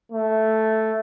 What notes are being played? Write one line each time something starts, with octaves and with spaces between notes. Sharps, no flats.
A3